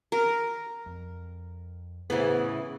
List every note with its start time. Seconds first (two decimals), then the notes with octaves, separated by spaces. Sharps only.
0.12 A#4
0.86 F2
2.10 A2 C#3 E3 B3